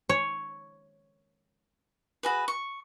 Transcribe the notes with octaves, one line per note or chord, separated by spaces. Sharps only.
C#5
F#4 G#4 B4
C#6